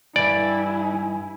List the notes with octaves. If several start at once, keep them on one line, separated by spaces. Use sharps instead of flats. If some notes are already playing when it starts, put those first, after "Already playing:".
G2 E3 E4 D5 G#5